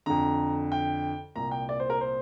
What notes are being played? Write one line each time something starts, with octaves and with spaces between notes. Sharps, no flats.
F2 D3 A#5
G5
C2 A#2 A#5
G5
D5
C5
A#4
C5